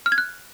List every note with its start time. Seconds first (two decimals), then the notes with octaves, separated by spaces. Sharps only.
0.06 F6
0.12 G#6
0.18 F#6